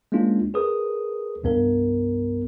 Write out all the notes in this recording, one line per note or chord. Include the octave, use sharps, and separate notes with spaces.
G#3 A#3 C#4 D4 F4
G#4 A#4 B4 D#6
C2 G2 B3 A#4